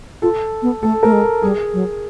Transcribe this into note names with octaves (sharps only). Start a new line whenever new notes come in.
F4 A4
B3
A3 A4
A3 A#4
G#3
A4
G3 G#4
F#3